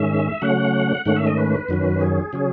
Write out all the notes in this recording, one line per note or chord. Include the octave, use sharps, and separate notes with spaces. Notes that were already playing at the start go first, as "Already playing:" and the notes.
Already playing: G#2 D#3 G#3 C#4 E5
C#3 F#3 A3 C#4 F#5
G#2 D#3 A3 C#4 F#5
E5
D#5
B4
F#2 D#3 F#3 C#4
G#4
C#3 F#3 C#4